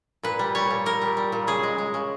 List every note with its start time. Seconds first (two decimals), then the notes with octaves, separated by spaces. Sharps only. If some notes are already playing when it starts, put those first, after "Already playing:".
0.23 A#2 B4
0.39 G3
0.55 G3 C#5
0.71 A#2
0.86 A#2 A#4
1.01 G3
1.17 G3
1.32 A#2
1.47 C#3 G#4
1.63 G#3
1.78 G#3
1.94 C#3